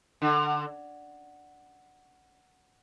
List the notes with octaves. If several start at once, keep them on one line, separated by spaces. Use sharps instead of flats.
D3